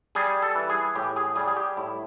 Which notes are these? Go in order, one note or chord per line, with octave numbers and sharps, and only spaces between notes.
G3 G#4
A4
E3
G#4
A2 G4
G#4
G3 G#4
G#4
G4
A2 E4